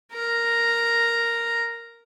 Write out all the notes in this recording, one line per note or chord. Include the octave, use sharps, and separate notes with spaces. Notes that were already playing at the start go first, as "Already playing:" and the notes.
A#4 A#5